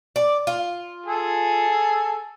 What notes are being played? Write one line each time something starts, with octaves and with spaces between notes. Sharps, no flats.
D5
F4
G#4 A4 G#5